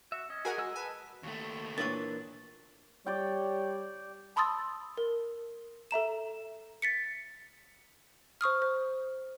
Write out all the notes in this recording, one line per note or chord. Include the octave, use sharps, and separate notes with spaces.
F#4 E5
C#4 D#5
F#4 G#4 A#4 F#5 G#5
G#3 D#5 E6
B4 D#5 G#5 A5
D#2 A3
A#2 E3 D4 A#4 C#5 C#6 A6
G3 C#5 D5 G5
A5 B5 C6 D#6 E6 A6
A#4
A4 E5 A#5 E7
A6 B6 C#7
C5 C#6 D#6 F6
C5